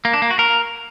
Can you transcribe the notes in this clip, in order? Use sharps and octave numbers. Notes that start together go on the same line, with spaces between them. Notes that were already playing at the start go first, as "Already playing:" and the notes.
A#3
D4
A#3
F#4
A#4